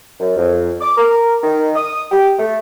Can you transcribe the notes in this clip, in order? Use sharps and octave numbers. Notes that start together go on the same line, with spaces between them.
F#2
F2
D6
A#4
D#3
D#6
G4
A3